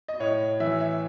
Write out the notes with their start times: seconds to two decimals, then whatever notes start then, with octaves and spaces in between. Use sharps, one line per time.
0.08 D#5
0.20 A2 C#5
0.60 E3 E5
0.81 E5